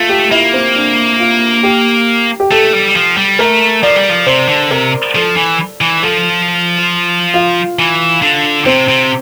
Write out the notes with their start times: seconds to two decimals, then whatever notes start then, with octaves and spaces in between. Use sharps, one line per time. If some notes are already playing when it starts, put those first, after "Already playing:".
Already playing: A3 F4
0.09 G4
0.31 A#3 E4
0.53 C4
0.75 D4
1.20 F4
1.63 G4
2.40 G4
2.51 A3 A4
2.73 G3
2.96 F3
3.17 G3
3.39 A3 A#4
3.83 F3 D5
3.96 G3
4.09 F3
4.27 C3 C5
4.48 D3
4.71 C3 A#4
5.15 F3 A4
5.37 E3
5.81 E3
6.02 F3 A4
7.34 F4
7.79 E3
8.22 D3
8.66 C3 C4
8.88 C3